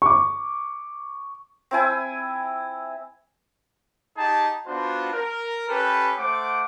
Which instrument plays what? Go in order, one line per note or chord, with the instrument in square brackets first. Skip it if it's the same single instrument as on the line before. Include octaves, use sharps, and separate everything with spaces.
[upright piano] C#6 D6
[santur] C4 E4 G#5
[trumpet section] D#4 G4 G#4 A5
B3 D4 F4 F#4 C5
A#4
C#4 G4 A4 B4
A3 C5 F#5 D6